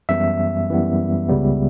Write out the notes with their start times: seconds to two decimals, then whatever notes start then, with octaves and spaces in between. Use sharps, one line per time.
0.09 F#2 E3 G3 B3 E5
0.69 F#2 E3 G3 B3
1.29 C#2 C#3 G3 B3